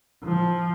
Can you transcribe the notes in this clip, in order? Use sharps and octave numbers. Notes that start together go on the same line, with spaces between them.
F3